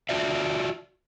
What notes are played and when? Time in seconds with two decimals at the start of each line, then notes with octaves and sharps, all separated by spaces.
0.09 F4 F#4 D5 E5